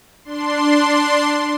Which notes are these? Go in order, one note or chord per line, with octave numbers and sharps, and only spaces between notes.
D4 C6